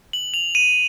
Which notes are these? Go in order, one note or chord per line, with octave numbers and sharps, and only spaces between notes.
F#7
F7
D#7